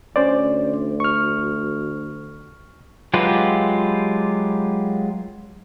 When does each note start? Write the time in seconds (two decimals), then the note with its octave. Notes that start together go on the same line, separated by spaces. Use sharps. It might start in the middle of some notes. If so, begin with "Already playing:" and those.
0.16 D2 C#4 C5 D5
1.00 C#6 F6
3.14 F#3 G#3 F4 G4 B4